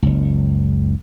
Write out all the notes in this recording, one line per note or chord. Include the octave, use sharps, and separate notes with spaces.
F#1 C#2